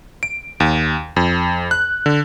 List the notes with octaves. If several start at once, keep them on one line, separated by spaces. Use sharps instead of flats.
D7
D#2
F2
F#6
D3